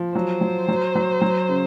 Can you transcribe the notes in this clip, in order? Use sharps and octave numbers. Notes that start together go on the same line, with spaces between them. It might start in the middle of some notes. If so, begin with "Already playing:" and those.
Already playing: F3
F#3 C5
F#3
F#3
F#3
F#3
C#3